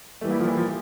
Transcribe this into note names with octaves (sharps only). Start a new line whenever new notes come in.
E3 G3 A3 A#3
E4
F3
E3
F3